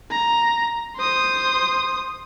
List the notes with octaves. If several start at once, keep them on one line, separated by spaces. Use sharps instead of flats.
A#5
C5 D#6